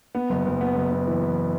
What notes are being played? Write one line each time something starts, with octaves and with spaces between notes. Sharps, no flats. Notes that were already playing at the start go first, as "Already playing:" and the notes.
B3
F#1
F#1
B3
F#1
B3
E3
E3